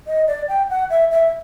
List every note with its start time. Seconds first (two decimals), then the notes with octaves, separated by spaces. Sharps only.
0.07 D#5
0.28 D5
0.48 G5
0.70 F#5
0.90 E5
1.11 E5